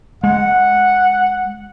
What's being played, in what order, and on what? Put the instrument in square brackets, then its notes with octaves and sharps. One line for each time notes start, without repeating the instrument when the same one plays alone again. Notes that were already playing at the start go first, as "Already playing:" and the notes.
[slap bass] G#3 [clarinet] F#5